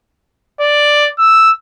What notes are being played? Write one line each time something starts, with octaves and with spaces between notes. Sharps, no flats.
D5
E6